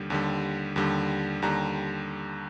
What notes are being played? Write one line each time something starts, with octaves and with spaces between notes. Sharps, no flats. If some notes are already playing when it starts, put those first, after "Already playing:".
Already playing: D#2 D3 G3
D#2 D3 G3
D#2 D3 G3
D#2 D3 G3 A#5